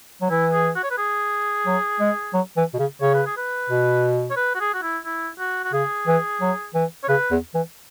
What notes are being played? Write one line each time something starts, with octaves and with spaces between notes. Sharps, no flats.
F#3
E3 E4
G#4
F#4
C#5
B4
G#4
F#3
G#3
F#3
E3
B2
C#3
C#3 C#5
B4
G#4
B4
B2
C#5
B4
F#4
G#4
F#4
E4
E4
F#4
F#4
C#3 G#4
E3
F#3
E3
C#5
C#3 B4
E2
E3